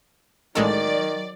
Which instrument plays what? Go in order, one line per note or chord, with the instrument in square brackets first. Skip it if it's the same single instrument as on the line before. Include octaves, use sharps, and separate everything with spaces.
[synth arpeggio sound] A1 G#3 A4 [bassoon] D#3 [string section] F#3 D5